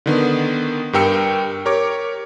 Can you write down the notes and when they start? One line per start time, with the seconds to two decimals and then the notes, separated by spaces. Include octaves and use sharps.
0.06 D3 D#3 B3
0.93 G2 G4 A#4 G5 E6 C#7
1.65 G4 A#4 C#5 C#6 D6